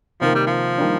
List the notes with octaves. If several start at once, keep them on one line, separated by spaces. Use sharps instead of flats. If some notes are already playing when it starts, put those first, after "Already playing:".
C3 D#3 F3 A#3
G3
F3
D#3 G3 A#3 D4